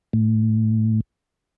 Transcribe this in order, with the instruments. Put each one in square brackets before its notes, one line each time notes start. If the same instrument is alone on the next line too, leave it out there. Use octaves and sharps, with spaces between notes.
[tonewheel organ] A2